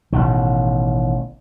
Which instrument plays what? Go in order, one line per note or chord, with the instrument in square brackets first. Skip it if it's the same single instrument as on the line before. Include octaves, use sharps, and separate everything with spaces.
[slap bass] A1 B2 D#3